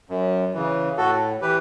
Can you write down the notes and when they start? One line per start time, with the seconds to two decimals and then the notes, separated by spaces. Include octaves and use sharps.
0.10 F#2
0.54 C#3 E3
0.97 A2 F#4 A4
1.42 E3 G4 B4